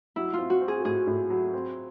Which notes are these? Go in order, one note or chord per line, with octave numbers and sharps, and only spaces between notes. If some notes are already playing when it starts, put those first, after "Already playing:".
F#3 E4
F4
C4
F#4
C4
G#4
A2 G#4
A2
F#3
C4